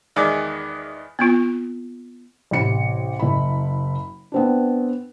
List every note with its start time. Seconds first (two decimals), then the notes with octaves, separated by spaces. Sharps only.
0.16 E2 D#3 G#3 D5 G#5 D6
1.19 B3 C4 F4
2.51 A1 C3 C#7
3.19 F#1 E4 B5
4.32 B3 C4 D4